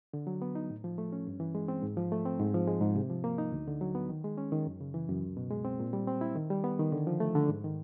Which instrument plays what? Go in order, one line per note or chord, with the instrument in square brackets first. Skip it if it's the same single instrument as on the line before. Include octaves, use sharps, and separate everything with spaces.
[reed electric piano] D3
F#3
B3
D#4
A2
F3
A3
C#4
G2
E3
G#3
C4
G#2
F3
A3
C4
G#2
F3
G#3
G#2
C3
F3
A#3
D#4
D2
D3
F#3
B3
D#3
G#3
C#4
D#3
F#2
C#3
E3
F#2
C#2
B2
G#3
C4
A#2
G3
C4
E4
D#3
G3
B3
D#3
D3
F3
A3
D3
G#2
D#3